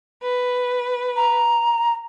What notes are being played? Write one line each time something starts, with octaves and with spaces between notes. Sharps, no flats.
B4
A#5